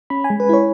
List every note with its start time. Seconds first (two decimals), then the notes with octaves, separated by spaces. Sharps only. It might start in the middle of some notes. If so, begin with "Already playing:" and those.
0.10 C#4 B5
0.24 G#5
0.30 G#3
0.40 B4
0.49 E4 C#5